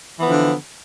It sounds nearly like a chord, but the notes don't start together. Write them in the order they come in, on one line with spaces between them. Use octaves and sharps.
E3 B3 F3 D3